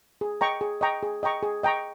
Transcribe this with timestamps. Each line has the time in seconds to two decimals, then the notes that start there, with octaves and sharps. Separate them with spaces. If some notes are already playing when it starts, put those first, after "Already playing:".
0.21 G#4
0.41 D#5 G5 A#5 C#6
0.61 G#4
0.81 D#5 G5 A#5 C#6
1.03 G#4
1.23 D#5 G5 A#5 C#6
1.43 G#4
1.63 D#5 G5 A#5 C#6